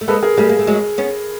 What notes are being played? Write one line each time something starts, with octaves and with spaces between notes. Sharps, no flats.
A3
G#3 A#3 A4 B4
G#4 A#4
G3 A3 G#4 A#4
A#3
A3
F#3 G#3
B3 C#4